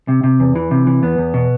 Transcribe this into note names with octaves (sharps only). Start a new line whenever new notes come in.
C3
C3
E2
E3
C3
E3
E2 B3
E2
B2